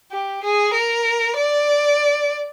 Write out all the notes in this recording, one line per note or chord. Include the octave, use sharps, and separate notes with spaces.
G4
G#4
A#4
D5